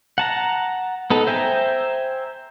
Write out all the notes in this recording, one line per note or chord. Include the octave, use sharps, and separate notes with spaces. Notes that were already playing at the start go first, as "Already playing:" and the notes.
F#5 A5 A#5
B3 D#4 A4
C5 E5 G5 G#5 A#5